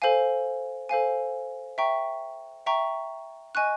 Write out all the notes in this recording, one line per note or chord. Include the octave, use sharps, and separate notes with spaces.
A4 C5 F5 G#5
A4 C5 F5 G#5
E5 G5 A#5 C#6
E5 G5 A#5 C#6
D#5 G#5 C#6 F#6